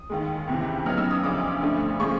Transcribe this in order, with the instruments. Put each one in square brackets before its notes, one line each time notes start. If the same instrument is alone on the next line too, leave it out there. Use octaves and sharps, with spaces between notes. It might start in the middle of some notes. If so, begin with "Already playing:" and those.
Already playing: [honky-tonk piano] D#6
D#2 D#3 G#3
C#2 C3 E3
C#3 F#3 B3 D#4 F6
E6
D#6
D2 C#3 F3 D6
G2 D3 F3 A3
C#3 F3 G#3 C#6